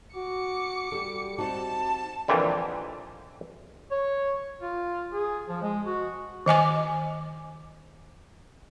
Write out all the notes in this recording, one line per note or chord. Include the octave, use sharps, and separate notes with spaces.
F#4 D6 C#7
G3 G4 A4
C4 D#4 F#4 A5
F2 A#2 D3 E3 G3
C#5
F4
G#4
F3
G#3
F#4
D#3 D#5 G#5 D6